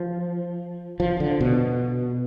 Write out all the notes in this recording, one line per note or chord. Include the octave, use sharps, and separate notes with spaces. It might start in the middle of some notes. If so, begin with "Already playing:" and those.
Already playing: F3
F3
D3
B2